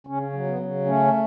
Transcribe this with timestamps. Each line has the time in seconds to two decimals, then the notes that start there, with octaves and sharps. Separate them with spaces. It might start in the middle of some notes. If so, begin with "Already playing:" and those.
0.07 C#3 C#4
0.33 F#3
0.46 B3
0.59 C#3
0.86 A3 C#4